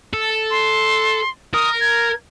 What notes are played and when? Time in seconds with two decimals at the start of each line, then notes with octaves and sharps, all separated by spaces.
0.13 A4
0.51 C6
1.54 A#4 D#6
1.81 G#6